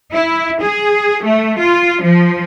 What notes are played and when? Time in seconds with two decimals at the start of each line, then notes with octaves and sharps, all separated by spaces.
0.13 E4
0.61 G#4
1.23 A3
1.59 F4
2.03 F3